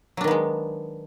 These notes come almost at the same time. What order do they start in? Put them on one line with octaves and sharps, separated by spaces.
F#3 D4 D#3 B3 G#3